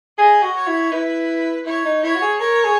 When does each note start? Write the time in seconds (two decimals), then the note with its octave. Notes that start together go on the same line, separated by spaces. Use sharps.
0.18 G#4 D#5
0.42 F#4
0.56 C#5
0.67 E4
0.92 E4 B4
1.66 E4 C#5
1.85 D#4
2.03 E4 C#5
2.16 F#4
2.22 G#4
2.39 A#4 C#5
2.64 G#4